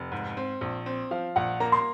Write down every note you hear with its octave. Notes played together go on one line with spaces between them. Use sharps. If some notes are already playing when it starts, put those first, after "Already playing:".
Already playing: F1
G#2
C4
A#1
C4
F3 F5
A#1 F#5
A#3 A#5
C6